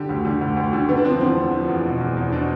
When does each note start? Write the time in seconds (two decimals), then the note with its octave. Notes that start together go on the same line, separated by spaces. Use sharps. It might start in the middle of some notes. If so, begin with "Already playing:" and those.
Already playing: D3 G4
0.09 D2
0.25 D3
0.41 D2
0.57 D2
0.73 D3
0.89 D3 B3
0.97 D4
1.05 F3 C4
1.21 E2 C4
1.37 E2
1.53 F3
1.69 E2
1.85 B2
2.01 E2
2.17 E2
2.32 B2 D4